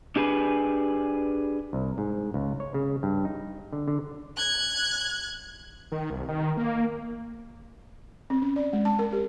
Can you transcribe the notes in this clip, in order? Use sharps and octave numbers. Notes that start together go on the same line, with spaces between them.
D4 G4 G#4 B4
C2
G#2
C#2
C#5
C#3
G2
D#4
D3
D3
F#6 G#6
D#3
C2
D#3
A#3
C4
C#4
D5
G#3
A5
A#4
G4